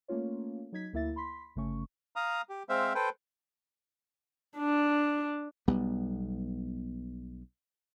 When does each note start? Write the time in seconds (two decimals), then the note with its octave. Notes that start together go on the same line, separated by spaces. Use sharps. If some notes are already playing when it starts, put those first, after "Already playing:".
0.08 A3 A#3 C#4 F4 C#5
0.72 F#3 D#4 G#6 B6
0.93 D2 A#3 E4 E5 A6
1.16 B5 C6 B6
1.56 G1 C#3 A3 C#4 C#6
2.16 F5 A#5 D#6
2.49 G4
2.69 G#3 C4 C5 E5 F5
2.95 A4 B4 C5 G5
4.57 D4
5.68 B1 G3 B3